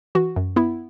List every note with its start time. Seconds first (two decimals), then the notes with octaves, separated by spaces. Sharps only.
0.15 E3 F#4
0.36 F#2
0.56 B3 E4